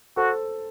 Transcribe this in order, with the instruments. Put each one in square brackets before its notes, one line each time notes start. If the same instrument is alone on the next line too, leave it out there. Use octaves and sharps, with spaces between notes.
[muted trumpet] F#4 [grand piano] A4 C5